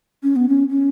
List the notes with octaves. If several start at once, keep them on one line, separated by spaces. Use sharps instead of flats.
C#4
B3
C#4
C#4